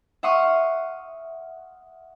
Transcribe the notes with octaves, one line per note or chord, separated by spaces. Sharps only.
E5 F#5 C6 C#6 D#6 F6